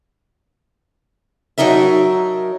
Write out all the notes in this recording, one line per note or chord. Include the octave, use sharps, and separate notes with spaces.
F#3 D4 D#4 A#4 E5